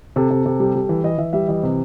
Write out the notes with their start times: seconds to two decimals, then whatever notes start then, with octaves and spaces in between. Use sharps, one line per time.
0.16 C3 A4
0.30 C3
0.46 C3
0.60 G3
0.75 G3
0.89 E3
1.04 E3 D#5
1.18 E3 E5
1.33 G3 E5
1.48 E3 D#5
1.63 C3